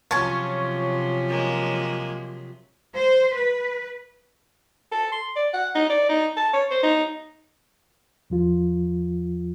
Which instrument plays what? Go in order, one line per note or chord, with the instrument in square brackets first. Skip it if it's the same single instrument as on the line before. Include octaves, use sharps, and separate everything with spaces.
[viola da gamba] C3 F3 F#3 [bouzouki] C#4 F4 [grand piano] A5 C#6 G#6
[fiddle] G#3 A#3
[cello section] C5
B4
[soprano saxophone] A4
C6
D5
F#5
D#4
D5
D#4
A5
C#5
C5
D#4
[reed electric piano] E2 F3 F4